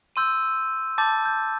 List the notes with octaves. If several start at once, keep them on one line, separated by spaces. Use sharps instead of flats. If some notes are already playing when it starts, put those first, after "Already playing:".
C6 E6 G6 D#7
A5 D6 G6 A6
G6